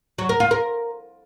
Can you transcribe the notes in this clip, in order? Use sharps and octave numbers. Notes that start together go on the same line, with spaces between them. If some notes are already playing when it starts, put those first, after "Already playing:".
F#3
A#4
F4
A#4